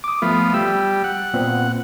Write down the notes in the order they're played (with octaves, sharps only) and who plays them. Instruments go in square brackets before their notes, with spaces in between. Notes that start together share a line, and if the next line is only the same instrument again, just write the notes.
[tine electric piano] D6 D#6
[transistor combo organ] F3 B3 [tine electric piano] A3
[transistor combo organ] G3 [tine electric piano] E6
[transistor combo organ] F#5
[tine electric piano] A#2 B3 C4